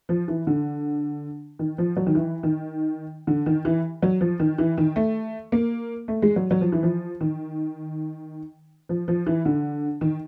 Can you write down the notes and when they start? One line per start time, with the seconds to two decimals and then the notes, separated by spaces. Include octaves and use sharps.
0.09 F3
0.28 E3
0.47 D3
1.59 D#3
1.78 F3
1.97 F#3
2.07 D#3
2.15 E3
2.43 D#3
3.27 D3
3.46 D#3
3.65 E3
4.02 F#3
4.21 F3
4.40 D#3
4.58 E3
4.78 D#3
4.96 A3
5.52 A#3
6.08 A3
6.22 G#3
6.36 F#3
6.51 F#3
6.61 F3
6.72 E3
6.83 F3
7.21 D#3
8.89 F3
9.08 F3
9.27 E3
9.45 D3
10.01 D#3